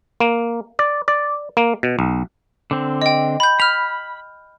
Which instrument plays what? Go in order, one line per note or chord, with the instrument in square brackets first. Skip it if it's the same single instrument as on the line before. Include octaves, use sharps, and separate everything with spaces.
[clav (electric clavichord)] A#3
D5
D5
A#3
B2
B1
[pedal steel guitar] D3 C4
[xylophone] D#5 G5
B5 G6
[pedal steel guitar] B5 [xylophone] F6 F7